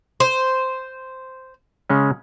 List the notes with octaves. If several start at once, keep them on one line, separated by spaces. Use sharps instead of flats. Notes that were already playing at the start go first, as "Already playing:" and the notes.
C5
C#3 G#3 C#4